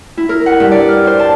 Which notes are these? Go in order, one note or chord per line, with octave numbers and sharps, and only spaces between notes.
E4
A#4
F#5
G2
D5
F6
C5
A5